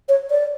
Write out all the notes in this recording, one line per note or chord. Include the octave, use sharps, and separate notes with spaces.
C#5
D5